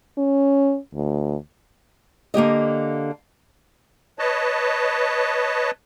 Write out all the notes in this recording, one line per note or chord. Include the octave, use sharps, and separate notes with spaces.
C#4
D2
D3 A#3 G4 D#5
B4 C#5 D#5 A5